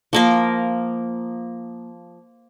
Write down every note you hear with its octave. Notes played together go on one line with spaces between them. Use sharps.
F3 A#3 A#4